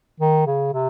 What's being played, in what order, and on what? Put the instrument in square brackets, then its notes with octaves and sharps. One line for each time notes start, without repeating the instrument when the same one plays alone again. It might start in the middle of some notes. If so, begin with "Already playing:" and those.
[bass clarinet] D#3
C#3
C3